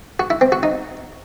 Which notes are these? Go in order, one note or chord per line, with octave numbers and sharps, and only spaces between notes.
F#4
E4
C4
F#4
D#4